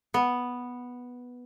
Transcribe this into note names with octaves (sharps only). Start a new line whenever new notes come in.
B3